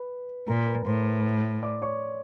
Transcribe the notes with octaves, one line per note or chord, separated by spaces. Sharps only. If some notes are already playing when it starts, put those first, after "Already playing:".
Already playing: B4 B5
A#2 A#4 A#5
B4 B5
A2 C5 C6
D5 D6
C#5 C#6